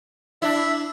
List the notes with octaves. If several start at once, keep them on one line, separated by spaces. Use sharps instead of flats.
D4 E4 E5